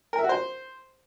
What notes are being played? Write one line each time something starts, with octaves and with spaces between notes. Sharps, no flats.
A#4
E5
F#4
C5